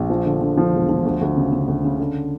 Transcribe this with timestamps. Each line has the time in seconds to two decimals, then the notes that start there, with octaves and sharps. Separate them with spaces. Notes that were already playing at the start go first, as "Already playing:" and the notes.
Already playing: A#1
0.10 F3
0.25 D3
0.41 D3
0.57 F3
0.73 E1
0.89 F3
1.05 D2
1.21 D2
1.37 C#3
1.52 C#3
1.68 D2
1.84 C#3
1.99 D3